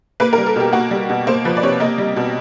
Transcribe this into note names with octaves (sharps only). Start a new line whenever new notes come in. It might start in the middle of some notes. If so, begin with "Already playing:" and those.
A#3 B4
A#4
G3
A4
B2 G4
A#3 F#4
G3
B2
A#3 C5
F3 B4
D5
C3 C#5
A#3 D#5
G3
B2